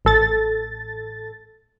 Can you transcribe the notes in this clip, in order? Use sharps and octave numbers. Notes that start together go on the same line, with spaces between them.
A1 A4 A6